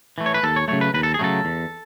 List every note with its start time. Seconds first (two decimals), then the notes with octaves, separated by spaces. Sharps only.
0.18 E3 A3
0.26 C#5
0.34 B4
0.43 D#2 A4
0.56 C#5
0.68 C#3 F#3 A3 C#5
0.81 B4
0.94 D#2 B4
1.03 A4
1.14 G#4
1.19 C#3 F#3 A3 A4
1.45 E2